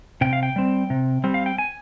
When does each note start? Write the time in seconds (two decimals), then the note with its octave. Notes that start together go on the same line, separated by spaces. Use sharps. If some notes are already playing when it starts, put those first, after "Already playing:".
0.21 C3 G5
0.33 F5
0.43 G5
0.56 G3 C4
0.90 C3
1.24 G3 C4
1.34 F5
1.46 G5
1.58 G#5